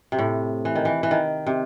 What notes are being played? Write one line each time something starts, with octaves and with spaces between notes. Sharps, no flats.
C3
A2
E3
D#3
E3
E3
D#3
C3